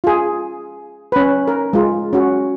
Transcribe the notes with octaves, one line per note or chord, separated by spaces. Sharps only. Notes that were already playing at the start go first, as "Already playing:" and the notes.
F4 G#4
C#4 B4
A#4
G#3 F4
C#4 F#4